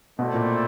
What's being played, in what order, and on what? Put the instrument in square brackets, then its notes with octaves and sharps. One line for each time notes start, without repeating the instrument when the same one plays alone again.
[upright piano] B2 [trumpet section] A3 C4 E4 A4 D5
[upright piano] A#2